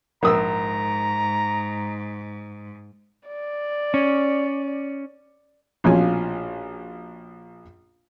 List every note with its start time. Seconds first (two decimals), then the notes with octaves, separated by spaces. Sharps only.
0.23 A#1 G#2 A#4 A#5 D#6 E6
3.28 D5
3.94 C#4
5.84 A#1 B2 F3 C#4 F5 G#5